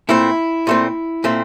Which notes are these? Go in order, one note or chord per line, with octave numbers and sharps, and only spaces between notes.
A#2 A3 C4 E4
A#2 A3 C4
A#2 A3 C4